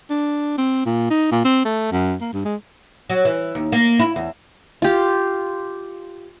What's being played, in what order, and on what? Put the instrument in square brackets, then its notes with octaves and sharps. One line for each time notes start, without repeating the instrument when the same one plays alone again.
[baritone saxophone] D4
C4
A#2
D#4
A#2
C4
A3
F#2
A#3
G2
G#3
[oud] F#3
E3
D#2
A#3
E4
E2
[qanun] F4 G4